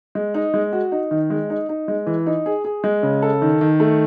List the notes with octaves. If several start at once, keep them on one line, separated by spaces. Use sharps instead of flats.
G#3
D#4
G#3
F#4
D#4
D#3
G#3
D#4
D#4
G#3
E3
D#4
G#4
G#4
G#3
C#3
A4
D#3
D#3
A3